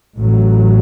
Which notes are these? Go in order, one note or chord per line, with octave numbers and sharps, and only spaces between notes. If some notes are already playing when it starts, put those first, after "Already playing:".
A1 A2 F#3